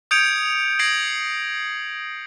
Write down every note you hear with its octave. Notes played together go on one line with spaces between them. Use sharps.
D#6 G6 G#6 C#7 D7 F7
G6 G#6 A#6 C7 D7 F#7